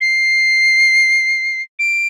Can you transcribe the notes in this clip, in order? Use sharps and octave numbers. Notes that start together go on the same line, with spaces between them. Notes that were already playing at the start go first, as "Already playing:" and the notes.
C7
D7